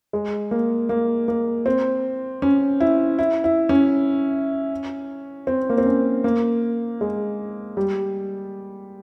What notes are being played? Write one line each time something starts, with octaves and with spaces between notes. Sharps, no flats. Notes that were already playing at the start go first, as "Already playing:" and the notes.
G#3
A#3
A#3
A#3
C4
C#4
E4
E4
E4
C#4
C4
A#3
C4
C#4
A#3
G#3
G3